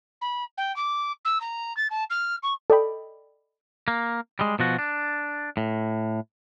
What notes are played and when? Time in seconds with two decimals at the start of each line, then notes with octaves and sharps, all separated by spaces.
0.22 B5
0.58 G5
0.76 D6
1.25 E6
1.41 A#5
1.77 A6
1.90 A5
2.10 F6
2.43 C#6
2.70 A4 D5 D#5 G5 B5
3.88 A#3
4.39 G3 G#3
4.59 B2 F3 F#4
4.79 D4
5.57 A2